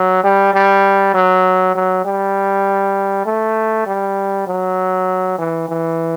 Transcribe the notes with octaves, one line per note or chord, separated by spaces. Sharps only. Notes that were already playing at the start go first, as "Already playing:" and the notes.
Already playing: F#3
G3
G3
F#3
F#3
G3
A3
G3
F#3
E3
E3